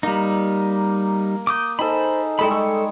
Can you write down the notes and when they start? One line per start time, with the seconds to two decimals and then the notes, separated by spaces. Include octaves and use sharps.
0.03 G3 A#3 D#4
1.47 D6 D#6 G6
1.79 D#4 G#4 A4 C5 B5
2.39 G3 G#3 E4 A4 B5
2.51 A4 C#6 E6